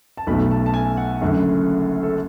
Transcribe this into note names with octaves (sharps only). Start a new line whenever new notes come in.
A5
B1 B2 A3 B5
A5
A5
G#5
F#5
F#1 F#2 D3 A3
A4